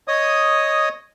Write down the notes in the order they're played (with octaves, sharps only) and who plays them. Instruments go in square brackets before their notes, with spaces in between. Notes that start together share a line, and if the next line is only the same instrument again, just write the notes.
[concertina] C#5 D#5 D#6